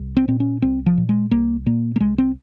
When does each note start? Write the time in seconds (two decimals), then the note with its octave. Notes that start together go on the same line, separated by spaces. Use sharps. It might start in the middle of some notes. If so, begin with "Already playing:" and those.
Already playing: C2
0.17 C4
0.28 A#2 C4
0.40 C#4
0.62 C2 C4
0.86 F3
0.97 A#2
1.09 G#3
1.31 C2 A#3
1.66 A#2 A#3
1.96 A#3
2.00 C2 G#3
2.18 C4